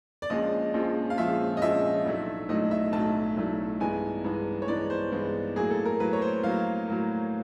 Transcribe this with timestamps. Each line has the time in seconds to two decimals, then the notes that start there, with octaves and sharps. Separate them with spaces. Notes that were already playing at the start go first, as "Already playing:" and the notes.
0.22 D5
0.30 A#1 A#2 F3 G#3 C#4 D#5
0.74 A#1 A#2 F3 G#3 C#4
1.10 F5
1.18 A#1 A#2 F3 G#3 C#4 E5
1.57 D#5
1.62 A#1 A#2 F3 G#3 C#4 E5
2.06 B1 A2 F#3 A3 D4
2.49 B1 A2 F#3 A3 D4 D#5
2.71 E5
2.93 B1 A2 F#3 A3 D4 A5
3.37 B1 A2 F#3 A3 D4
3.80 G2 E3 G#3 B3 D#4 G#5
4.24 G2 E3 G#3 B3 D#4
4.62 C#5
4.68 G2 E3 G#3 B3 D#4 D5
4.90 C5
5.12 G2 E3 G#3 B3 D#4
5.56 A2 F#3 A#3 G#4
5.71 A4
5.85 A#4
6.00 A2 F#3 A#3 B4
6.13 C#5
6.22 C5
6.43 A2 F#3 A#3 F5
6.88 A2 F#3 A#3